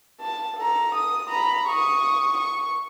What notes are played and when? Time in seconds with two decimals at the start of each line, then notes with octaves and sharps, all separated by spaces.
0.21 A5
0.57 A4 A#5
0.95 D#6
1.29 A#5 B5
1.67 C#6 D#6
2.38 C#6